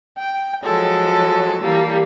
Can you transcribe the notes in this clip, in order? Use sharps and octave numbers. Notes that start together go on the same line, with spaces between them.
G5
F3 F#3 G#3 A4
E3 G3 A#3